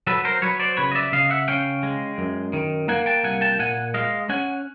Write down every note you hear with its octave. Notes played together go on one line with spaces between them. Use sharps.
F#3 A4 B4
A#4 C5
F#3 B4 C#5
C5 D5
C#3 B4 C#5
D#5
D5 E5
C#3 D#5 F5
E5 F#5
C#4 F5 G5
G#3
F#2
D#3
A#3 F#5 G#5
G5 A5
C2 F#5 G#5
G5 A5
A#2 F#5 G#5
G#3 D#5 F5
C#4 F#5 G#5